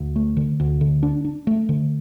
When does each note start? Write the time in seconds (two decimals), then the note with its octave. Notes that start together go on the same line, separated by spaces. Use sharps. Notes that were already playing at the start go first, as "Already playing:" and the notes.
Already playing: D2
0.16 A3
0.37 D3
0.60 D2
0.81 D3
1.03 D4
1.25 D4
1.47 A3
1.69 D3